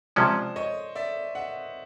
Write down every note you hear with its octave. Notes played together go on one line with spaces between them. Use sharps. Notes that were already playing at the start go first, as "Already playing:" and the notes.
C3 F3 G#3 C#4 C5 D5
C#5 D#5
D5 E5
E5 F#5